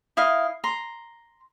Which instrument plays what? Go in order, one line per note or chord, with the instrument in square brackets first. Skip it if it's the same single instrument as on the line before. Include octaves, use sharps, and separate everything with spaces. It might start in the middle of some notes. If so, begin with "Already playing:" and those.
[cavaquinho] E4 D#5 F5
A#5 C6